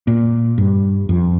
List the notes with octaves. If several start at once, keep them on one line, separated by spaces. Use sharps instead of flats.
A#2
G2
F2